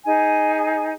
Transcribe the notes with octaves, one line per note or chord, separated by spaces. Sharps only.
D#4 G#4 G#5